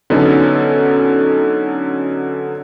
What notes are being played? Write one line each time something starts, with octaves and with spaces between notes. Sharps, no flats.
D3 F#3 B3 C#4 D#4 A4